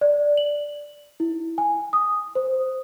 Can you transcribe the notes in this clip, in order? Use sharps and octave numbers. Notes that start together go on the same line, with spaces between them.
D5
F#7
E4
G#5
D#6
C5